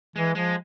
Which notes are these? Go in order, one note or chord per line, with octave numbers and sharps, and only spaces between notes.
E3 G#3
F3 G#3